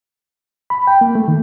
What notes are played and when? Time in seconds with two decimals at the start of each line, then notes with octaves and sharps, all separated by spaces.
0.70 B5
0.87 G5
1.01 A#3
1.15 A3
1.28 D#3